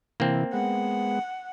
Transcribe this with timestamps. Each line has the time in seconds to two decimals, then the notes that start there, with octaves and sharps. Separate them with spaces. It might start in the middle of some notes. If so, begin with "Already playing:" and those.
0.20 C3 E3 A#3 C4
0.53 G#3 B3 F#5